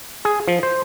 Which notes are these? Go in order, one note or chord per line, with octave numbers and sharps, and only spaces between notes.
G#4
F3
C5